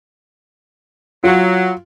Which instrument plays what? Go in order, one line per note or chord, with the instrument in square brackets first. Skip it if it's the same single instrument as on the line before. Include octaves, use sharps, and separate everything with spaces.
[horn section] F#3 [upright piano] F4